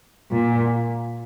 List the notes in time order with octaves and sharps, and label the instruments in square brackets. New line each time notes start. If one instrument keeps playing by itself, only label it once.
[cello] A#2